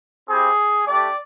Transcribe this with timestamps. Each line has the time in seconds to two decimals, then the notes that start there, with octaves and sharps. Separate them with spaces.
0.28 C4 E4 G4 G#4
0.86 A3 D4 G4 D5